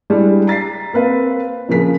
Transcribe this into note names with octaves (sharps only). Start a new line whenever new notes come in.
G3 G#3 D4 E4
A#5 A6 B6 C7
A#3 C4 B4 F5
A#2 C#3 F3 G#4 A#4 B6